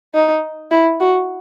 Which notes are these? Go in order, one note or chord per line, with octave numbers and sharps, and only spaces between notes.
D#4
E4
F#4